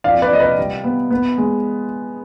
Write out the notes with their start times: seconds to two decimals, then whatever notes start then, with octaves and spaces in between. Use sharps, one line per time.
0.04 F2 D5 F5
0.22 B4 D5
0.31 C3 D#5
0.40 B4 D5
0.58 G3
0.84 B3
1.11 B3
1.38 G#3